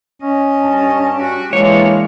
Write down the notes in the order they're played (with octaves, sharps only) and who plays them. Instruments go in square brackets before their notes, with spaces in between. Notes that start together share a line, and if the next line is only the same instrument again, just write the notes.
[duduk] C#4 [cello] D#5
[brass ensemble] G2 A5
[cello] F#4 G4
[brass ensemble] E3 D4 [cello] G#3 [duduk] A#3 [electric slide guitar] C#5